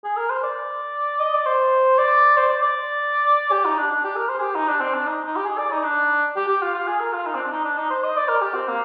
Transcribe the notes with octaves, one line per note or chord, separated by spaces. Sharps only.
G#4
A#4
C5
D5
D#5
D5
C5
D5
C5
D5
D5
G4
D#4
D4
D4
G4
A#4
C5
G#4
G4
D#4
D4
C4
D4
D#4
D#4
G4
G#4
D5
D#4
D4
G4
G4
F4
F4
G#4
A#4
F4
D#4
C4
D4
D#4
D4
D#4
C5
D#5
D5
A#4
G4
C4
A#3